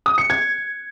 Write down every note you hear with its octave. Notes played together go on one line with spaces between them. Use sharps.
D#6
C#7
G#6